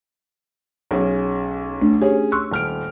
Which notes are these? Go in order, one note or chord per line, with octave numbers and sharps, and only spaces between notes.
B1 C#4 G#4
A3 D4
C#4 G4 G#4 C#5
C6 C#6 E6 F#6
D#1 F6 D7